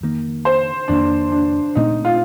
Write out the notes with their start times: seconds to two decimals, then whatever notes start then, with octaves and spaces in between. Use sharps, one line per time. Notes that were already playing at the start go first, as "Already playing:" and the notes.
0.01 F2 D#3 A#3
0.45 C5
0.88 F2 D#3 A#3 D4
1.32 D4
1.75 A#2 A3 C4 D#4
2.05 F4